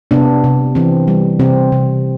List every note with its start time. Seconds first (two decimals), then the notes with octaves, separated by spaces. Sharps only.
0.11 C3 B3 D4
0.44 C3
0.75 E3 C4
1.08 G3
1.40 C3 C4
1.72 C3